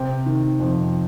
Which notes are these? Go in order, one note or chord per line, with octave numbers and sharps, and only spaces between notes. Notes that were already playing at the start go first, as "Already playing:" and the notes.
Already playing: C3 G5
D#3
F2